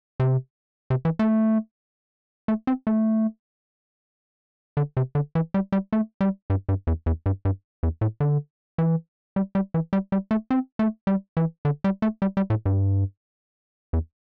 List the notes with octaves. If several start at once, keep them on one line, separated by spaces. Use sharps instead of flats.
C3
C3
E3
A3
A3
C4
A3
D3
C3
D3
E3
G3
G3
A3
G3
G2
G2
E2
E2
G2
G2
E2
A2
D3
E3
G3
G3
E3
G3
G3
A3
C4
A3
G3
E3
D3
G3
A3
G3
G3
A2
G2
E2